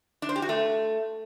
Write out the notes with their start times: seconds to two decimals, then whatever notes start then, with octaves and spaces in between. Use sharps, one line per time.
0.22 D4
0.29 C5
0.36 G4
0.42 F#4
0.49 A3